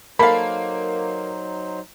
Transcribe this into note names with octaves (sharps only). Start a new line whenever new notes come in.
F#3 A#3 D#4 A4 C5 F5 B5